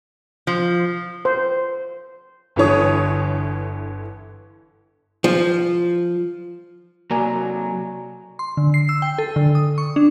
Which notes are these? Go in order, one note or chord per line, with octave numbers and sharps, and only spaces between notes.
F3
C5
G1 D3 E3 C#5 D#6
F3
C3 F#3 A#3 D5 G#5 A#5
C6
D3
C7
E6
G5
A4
D3
D#6
C#6
D4